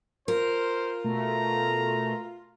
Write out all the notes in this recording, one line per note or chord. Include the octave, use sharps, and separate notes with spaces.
F4 A#4 C5
B2 A3 A#5